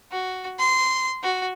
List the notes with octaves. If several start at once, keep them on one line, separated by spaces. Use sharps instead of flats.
F#4
C6
F#4